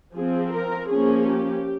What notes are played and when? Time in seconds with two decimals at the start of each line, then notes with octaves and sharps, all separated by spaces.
0.14 F3 C4 G#4
0.52 A#4
0.89 F3 A#3 C#4 G#4
1.27 G4